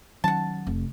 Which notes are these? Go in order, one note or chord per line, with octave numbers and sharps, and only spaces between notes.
D#3 F#3 C#4 F#5 A5
F1